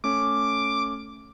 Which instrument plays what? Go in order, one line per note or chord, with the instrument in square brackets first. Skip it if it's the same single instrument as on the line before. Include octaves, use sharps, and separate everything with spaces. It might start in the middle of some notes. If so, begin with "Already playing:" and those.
[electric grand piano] A3 C#4 [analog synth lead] D6